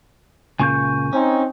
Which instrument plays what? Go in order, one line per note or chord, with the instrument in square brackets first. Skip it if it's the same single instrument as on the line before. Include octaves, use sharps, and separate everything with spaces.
[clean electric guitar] C#2 A#2 C#3 [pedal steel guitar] G#5 C#6 G6
[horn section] C4 D#4 [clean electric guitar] C#4